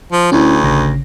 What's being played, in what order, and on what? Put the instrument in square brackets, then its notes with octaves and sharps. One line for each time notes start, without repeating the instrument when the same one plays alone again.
[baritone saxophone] F3
[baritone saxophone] D2 [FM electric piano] C#4 E4
[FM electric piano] A1 C#3 A#6